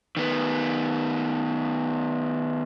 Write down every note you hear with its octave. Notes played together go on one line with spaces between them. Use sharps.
D#3 B3